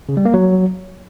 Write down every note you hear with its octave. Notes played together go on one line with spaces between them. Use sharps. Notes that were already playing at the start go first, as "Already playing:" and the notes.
C#3
G3
A#3
F#3